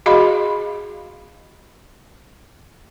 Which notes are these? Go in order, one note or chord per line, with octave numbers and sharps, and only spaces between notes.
F#4 G#4 D#5 F5 B5 C6